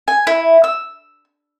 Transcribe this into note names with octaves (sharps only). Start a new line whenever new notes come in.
G#5
E4
E6